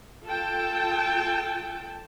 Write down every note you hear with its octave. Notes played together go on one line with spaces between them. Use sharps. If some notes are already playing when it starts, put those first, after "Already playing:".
F4 A4 G5 A5